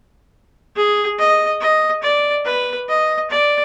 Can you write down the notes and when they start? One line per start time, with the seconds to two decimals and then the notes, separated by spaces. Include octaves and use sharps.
0.76 G#4
1.19 D#5
1.61 D#5
2.03 D5
2.45 B4
2.88 D#5
3.30 D5